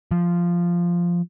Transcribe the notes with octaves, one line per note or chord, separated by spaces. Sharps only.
F3